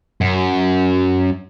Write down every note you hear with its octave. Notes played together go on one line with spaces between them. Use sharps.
F#2